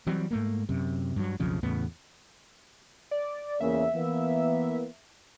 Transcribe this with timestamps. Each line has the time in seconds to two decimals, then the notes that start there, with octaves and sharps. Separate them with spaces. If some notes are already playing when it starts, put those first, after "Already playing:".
0.07 E3 F#3 G3 C4
0.31 G#2 A3 A#3
0.69 F#2 C3
1.16 G2 F#3
1.40 B1 F2 C#3 F3
1.63 E2 A2 C#3 B3
3.11 D5
3.61 E2 C#3 A#3 E5
3.94 E3 A#3 B3